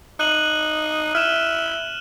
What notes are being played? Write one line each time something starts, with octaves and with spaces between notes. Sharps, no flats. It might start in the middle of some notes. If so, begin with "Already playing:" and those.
D#4 F#6 D#7 F#7
E4 F6 E7